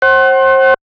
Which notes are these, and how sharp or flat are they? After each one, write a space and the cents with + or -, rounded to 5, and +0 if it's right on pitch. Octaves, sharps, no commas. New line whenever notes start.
C5 +30 F#5 +35